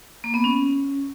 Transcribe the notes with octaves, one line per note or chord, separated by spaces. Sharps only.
A#3
B3
C#4